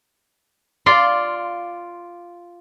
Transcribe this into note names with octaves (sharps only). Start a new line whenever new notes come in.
F4 D5 C6